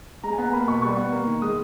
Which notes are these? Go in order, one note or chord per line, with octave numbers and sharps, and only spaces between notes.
G#3 A#5
G#5
B3 A#5
A#3 B5
B2 C#6
G3 C#6
B3
A#3
D#3
G#3 D#6